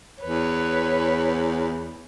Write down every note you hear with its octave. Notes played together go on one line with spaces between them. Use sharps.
E2 B4 C#5